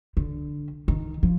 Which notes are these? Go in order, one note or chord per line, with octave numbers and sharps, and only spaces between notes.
D3
D#3
F3